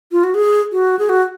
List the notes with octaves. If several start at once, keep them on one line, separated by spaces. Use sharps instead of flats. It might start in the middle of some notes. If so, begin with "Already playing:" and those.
F4
F#4
G#4
F#4
G#4
F#4